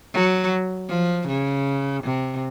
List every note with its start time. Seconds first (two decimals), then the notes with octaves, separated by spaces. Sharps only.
0.14 F#3
0.89 F3
1.28 C#3
2.03 C3